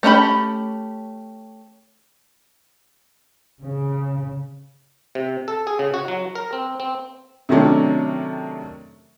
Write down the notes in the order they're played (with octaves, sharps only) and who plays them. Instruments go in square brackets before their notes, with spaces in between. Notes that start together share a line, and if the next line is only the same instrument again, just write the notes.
[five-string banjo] A3 C#4 G4 A#5 B5
[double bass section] C#3
[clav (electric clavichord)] C3
A4
G#4
C#3
F#4
F#3
A#4
C4
C4
[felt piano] C3 D#3 F#3 A3 C#4 D4